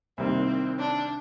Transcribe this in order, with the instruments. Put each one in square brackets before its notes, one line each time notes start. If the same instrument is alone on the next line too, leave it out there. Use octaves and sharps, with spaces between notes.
[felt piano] C2 C3 D#3 G3 A#3 [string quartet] C4
[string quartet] D4